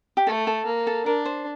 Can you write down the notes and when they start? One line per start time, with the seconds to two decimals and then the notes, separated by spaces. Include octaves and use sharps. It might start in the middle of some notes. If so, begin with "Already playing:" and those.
0.17 G4
0.27 A3 A4
0.47 A4
0.66 A#3
0.87 A4
1.06 D4 A#4
1.25 C5